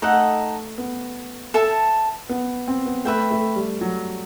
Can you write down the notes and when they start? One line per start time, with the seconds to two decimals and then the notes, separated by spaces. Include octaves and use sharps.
0.02 A3 D#4 A4 D#5 F#5
0.78 B3
1.54 A4 E5 A5
2.29 B3
2.68 C4
2.86 B3
3.05 A3 B4 E5 G5
3.31 A3
3.56 G3
3.81 F#3